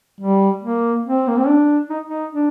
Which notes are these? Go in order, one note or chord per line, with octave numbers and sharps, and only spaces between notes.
G3
A#3
C4
A#3
C4
D4
D#4
D#4
D4